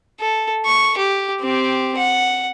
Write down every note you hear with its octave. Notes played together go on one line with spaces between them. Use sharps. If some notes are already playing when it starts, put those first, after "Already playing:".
A4
C#6
G4
C4 G4
F#5